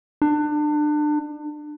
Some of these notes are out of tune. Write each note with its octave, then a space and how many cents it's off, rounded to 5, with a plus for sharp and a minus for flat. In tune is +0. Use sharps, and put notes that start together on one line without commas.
D4 +30